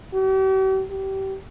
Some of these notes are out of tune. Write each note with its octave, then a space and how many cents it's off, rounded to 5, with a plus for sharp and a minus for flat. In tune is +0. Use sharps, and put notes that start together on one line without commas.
G4 -45
G4 -25